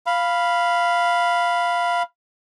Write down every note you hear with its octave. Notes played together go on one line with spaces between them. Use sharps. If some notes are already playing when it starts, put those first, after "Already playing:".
F5 B5